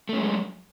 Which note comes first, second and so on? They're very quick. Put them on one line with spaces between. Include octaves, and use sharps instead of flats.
A3 C#4 G#3 F#3